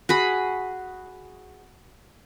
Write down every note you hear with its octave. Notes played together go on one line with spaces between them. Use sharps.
F#4 G#4 B5